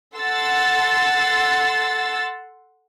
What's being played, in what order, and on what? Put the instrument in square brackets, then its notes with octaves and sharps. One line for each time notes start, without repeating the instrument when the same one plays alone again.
[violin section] A4 F#5 C6 E6 A6